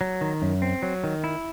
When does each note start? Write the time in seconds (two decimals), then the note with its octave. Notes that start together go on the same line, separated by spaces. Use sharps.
0.01 F#3
0.21 D#3
0.42 F#2
0.62 C4
0.82 F#3
1.04 D#3
1.24 E4